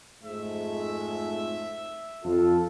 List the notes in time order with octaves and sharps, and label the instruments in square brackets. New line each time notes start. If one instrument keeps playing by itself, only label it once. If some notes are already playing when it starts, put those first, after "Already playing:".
[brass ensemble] F2 G#2 A3 [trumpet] E5
[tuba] F2 [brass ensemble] F4 A4